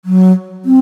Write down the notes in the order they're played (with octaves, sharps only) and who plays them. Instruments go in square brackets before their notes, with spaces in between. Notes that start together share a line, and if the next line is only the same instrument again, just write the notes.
[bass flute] F#3
C4